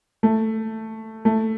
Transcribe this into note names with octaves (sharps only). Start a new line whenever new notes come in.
A3
A3